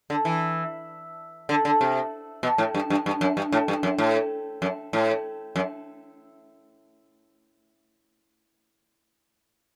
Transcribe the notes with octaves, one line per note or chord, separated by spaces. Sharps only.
D3
E3
D3
D3
C3
B2
A2
G2
G2
G2
F#2
G2
A2
G2
F#2
A2
F#2
A2
F#2